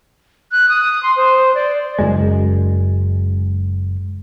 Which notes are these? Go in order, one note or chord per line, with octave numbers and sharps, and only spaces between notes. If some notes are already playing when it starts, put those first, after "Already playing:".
F#6
D#6
C6
C5
D5
F#1 F#2 G#3